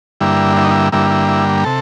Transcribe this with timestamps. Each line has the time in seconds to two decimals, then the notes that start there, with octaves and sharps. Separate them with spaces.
0.21 G2 D3 G3 A#3 E4
0.57 E4
0.64 D#4
0.71 E4
0.92 G2 D3 G3 A#3 E4
1.10 E4
1.28 E4
1.64 C3 A4